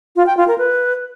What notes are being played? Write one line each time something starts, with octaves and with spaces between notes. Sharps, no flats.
F4
G5
F4
A#4
B4